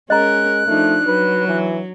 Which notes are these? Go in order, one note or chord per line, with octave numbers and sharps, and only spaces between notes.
G#3 C#4 A#4 D#5 A#5 F#6
F3 A3 D4 D#4
F#3 B4
E3